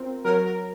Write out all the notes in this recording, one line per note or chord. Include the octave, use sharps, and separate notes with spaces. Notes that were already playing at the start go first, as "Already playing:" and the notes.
Already playing: C4 F4 A#4
F#3 A#4
A#4